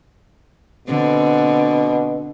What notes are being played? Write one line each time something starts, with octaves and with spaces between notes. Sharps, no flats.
B2 D3 C4